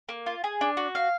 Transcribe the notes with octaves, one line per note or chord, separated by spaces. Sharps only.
A#3
F4
G#4
D4
F#4
F5